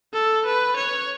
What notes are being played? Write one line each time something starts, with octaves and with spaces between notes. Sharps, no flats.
A4
B4
C#5